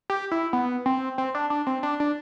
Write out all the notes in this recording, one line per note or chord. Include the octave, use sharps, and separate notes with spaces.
G4
E4
B3
C4
C4
D4
D4
C4
D4
D4